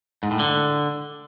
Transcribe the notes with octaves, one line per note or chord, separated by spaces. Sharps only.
G#2
A2
D3